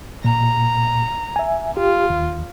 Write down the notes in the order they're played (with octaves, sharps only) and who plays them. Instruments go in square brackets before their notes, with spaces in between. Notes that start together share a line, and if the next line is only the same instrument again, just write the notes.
[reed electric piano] A#2 [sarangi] A#5
[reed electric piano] E5 G#5
[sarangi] F4 [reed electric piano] G4
[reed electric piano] D#2